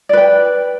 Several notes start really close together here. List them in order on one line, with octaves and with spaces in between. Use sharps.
D5 B4 G5